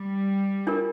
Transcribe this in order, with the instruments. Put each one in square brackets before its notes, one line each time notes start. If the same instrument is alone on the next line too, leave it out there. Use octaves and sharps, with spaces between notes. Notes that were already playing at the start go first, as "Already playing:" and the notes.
Already playing: [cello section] G3
[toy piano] D4 F4 A#4